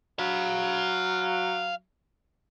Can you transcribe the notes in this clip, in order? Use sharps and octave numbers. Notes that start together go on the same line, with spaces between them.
F#3 F5 B5